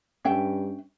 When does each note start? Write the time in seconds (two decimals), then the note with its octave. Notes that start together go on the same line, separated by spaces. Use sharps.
0.25 G2 C#4 E5 G5